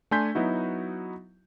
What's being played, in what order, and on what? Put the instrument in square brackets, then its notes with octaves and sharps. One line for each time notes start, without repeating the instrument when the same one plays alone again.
[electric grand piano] A3 D4 G#5 C6 G6 B6
F#3 B3 D#4 E4 F#4